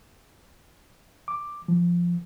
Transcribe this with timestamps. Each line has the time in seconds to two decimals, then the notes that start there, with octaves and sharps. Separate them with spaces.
1.28 D6
1.68 F3